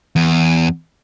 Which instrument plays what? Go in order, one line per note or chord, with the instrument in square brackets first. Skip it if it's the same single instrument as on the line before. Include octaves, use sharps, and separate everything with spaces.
[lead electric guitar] E2